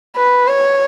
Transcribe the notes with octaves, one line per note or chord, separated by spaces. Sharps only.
B4
C#5